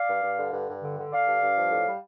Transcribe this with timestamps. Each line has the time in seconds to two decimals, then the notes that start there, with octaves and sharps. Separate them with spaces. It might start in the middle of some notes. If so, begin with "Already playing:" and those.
Already playing: D5 F5
0.08 G2
0.22 G2
0.37 D3
0.52 G2
0.68 G2
0.82 D3
0.98 D3
1.12 D3 D5 F5
1.27 G2
1.42 G2
1.56 F3
1.72 A2
1.87 G3